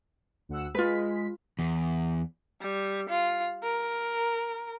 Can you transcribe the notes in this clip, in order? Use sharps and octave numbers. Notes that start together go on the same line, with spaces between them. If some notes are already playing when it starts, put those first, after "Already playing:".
D2 F#5 E6
G#3 F4 B4 B6
E2
G3
F4
A#4